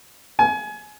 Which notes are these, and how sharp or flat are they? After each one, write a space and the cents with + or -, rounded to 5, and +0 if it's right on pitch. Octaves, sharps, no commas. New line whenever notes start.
G#5 +25